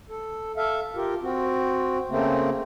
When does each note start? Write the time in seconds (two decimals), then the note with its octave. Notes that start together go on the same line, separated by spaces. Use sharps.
0.09 A4
0.57 A4 E5 F5
0.96 F4 G4 A#4
1.22 C4 F#4
2.10 C#3 A3 A#3 C4